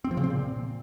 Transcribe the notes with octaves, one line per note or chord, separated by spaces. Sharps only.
C4
F3
C#3
C4
A#2